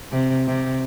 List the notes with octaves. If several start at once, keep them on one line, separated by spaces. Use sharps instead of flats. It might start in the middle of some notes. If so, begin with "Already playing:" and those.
C3
C3